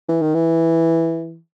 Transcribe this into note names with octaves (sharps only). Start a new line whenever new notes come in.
E3
D#3
E3